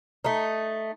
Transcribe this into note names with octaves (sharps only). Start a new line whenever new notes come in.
A3 D#4